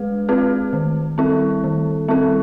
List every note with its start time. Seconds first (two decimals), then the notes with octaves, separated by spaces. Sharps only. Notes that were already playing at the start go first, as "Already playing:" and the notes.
Already playing: G#3 G#4 B4
0.29 C4 F4 G#4 B4
0.73 D#3
1.18 G3 C4 E4 A4
1.64 D#3
2.08 G3 C4 E4 A4